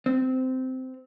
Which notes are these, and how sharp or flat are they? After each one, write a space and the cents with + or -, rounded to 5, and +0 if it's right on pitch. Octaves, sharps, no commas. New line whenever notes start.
C4 -15